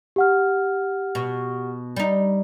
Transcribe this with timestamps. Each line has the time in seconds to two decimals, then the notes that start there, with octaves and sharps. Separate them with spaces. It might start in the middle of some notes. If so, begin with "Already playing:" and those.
0.16 G4 F#5 F6
1.15 B2
1.96 G3 D#4